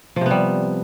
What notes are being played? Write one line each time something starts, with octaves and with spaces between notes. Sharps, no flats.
C3 F3 G3 B3